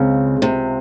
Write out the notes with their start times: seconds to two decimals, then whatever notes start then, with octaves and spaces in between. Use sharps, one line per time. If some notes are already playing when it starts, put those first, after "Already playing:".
Already playing: C#2 C#3 G#3 C4
0.42 C3